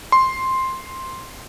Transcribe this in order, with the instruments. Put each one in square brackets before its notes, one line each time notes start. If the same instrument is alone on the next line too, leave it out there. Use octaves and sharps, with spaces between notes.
[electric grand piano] C6